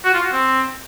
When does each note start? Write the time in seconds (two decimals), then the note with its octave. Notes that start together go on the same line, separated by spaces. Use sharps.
0.05 F#4
0.14 F4
0.23 F#4
0.33 C4